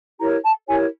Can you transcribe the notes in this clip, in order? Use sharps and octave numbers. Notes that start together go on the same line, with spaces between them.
E4 G4 A#4 C#5 A#5
A5
E4 G4 A#4 C#5 G#5